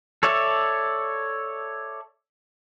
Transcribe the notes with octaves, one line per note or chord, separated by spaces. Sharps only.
A4 C#5 D5 E5